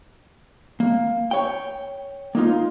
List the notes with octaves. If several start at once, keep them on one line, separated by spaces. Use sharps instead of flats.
A#3
C#5 G5
A#3 D#4 F4